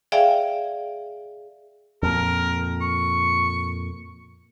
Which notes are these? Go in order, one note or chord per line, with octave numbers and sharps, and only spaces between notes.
G#4 D5 E5 F5 G5 G#5
F2 A#2 A#4
C#6